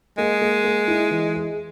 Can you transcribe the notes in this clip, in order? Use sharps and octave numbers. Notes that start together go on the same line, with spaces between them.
G#3 A#3
A#3
A#3
E4
E3
G#4